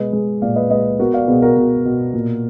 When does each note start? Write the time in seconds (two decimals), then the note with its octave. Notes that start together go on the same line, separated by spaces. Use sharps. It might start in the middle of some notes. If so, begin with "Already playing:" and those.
Already playing: B2 G#3 B4 D#5
0.13 G#3
0.42 A#2 D5 F5
0.56 B4 D#5
0.71 G#3 B4 D#5
0.99 B3 F#4 A#4
1.13 D5 F5
1.27 B2 G#4 B4
1.42 F#4 A#4
1.57 B2
1.85 B2
2.14 A#2